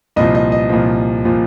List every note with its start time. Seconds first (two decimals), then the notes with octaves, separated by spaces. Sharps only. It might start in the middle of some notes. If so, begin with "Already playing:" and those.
0.16 C2 A#2 F3 D#5
0.35 D#5
0.52 D#5
0.70 C2 A#2 F3
1.25 A#2 F3